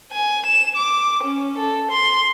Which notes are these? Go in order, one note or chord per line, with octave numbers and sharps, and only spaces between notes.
G#5
E7
D6
C#4
A4
C6